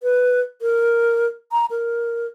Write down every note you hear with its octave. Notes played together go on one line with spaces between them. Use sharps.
B4
A#4
A#5
A#4